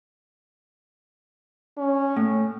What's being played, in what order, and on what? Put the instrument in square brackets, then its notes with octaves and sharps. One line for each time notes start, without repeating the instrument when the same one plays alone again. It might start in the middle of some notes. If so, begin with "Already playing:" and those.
[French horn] C#4
[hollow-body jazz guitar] A2